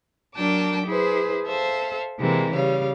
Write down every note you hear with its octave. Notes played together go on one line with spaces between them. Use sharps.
F#3 D4 A#4 G5 A5 D6
E4 G#4 B4 C5
A4 C5 E5 F5
C3 E3 G#3 A#3 C4
C#3 G3 C#5 F5